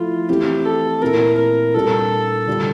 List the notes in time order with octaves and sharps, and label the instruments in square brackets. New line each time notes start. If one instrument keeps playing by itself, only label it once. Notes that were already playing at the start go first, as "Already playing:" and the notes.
Already playing: [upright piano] F3 A3 E4 [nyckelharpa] F4
[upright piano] E3 A3 C4 E4 [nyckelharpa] G4
[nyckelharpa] A4
[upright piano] A#2 A3 C4 E4 [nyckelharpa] A#4
[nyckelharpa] A#4
[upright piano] A#2 G3 A#3 D4 F4 [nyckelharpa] A4
[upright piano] D3 G3 D4 F4